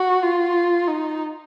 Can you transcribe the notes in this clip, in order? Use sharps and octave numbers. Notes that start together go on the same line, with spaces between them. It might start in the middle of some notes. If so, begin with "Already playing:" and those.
Already playing: F#4
F4
D#4